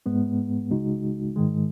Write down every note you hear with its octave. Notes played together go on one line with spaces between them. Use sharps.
G#2 G#3 B3
C#2 C#3 G#3 D#4 F#4
G#2 D#3 G#3